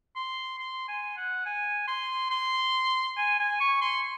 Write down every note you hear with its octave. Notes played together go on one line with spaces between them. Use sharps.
C6
C6
G#5
F#5
G#5
C6
C6
G#5
G#5
C#6
C6